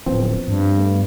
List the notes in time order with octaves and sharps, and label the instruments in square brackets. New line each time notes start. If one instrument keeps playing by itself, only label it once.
[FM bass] D1 [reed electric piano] F3 B3 C4
[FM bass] G2
[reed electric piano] A3 B3